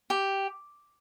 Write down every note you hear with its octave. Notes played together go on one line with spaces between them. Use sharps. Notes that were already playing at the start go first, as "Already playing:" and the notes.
G4